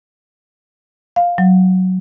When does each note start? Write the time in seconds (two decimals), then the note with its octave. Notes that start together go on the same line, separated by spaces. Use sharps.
1.16 F5
1.38 F#3